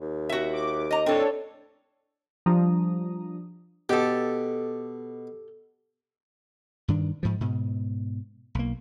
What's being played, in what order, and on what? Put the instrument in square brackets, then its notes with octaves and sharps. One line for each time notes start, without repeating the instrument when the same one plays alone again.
[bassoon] D#2
[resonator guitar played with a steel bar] F#4 E5
[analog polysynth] D6
[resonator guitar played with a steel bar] D#5 A#5
[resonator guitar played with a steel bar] A2 C4 [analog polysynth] D4 A4 C#5
[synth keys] F3 G3 D4 A#5 D#6
[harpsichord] B2 [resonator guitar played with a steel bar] G4 A4
[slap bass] G2 D#3 D4
G#2 F3
G#2 B2
B1 A#3